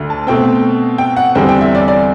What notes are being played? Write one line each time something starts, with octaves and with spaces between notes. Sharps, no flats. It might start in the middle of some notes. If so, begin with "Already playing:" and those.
Already playing: D2 D3
A5
B2 A3 C4 G5
G5
F#5
E2 D3 G3 C4 G5
G5
E5
D5
D5